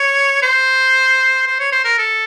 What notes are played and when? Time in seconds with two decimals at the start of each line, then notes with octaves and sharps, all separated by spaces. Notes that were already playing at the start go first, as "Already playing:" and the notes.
Already playing: C#5
0.42 C5
1.47 C5
1.59 C#5
1.72 C5
1.84 A#4
1.98 A4